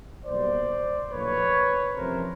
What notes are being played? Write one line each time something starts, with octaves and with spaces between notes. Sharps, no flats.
B1 B2 G3 A#3 C5 D5
A#1 A2 F#3 A#3 B4 C#5
F2 C3 E3 A3 C#4 A#4 C5